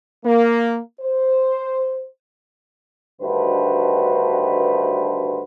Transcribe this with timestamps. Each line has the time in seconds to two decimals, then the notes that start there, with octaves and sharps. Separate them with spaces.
0.24 A#3
1.00 C5
3.21 D2 G2 D#3 F#4 B4 C5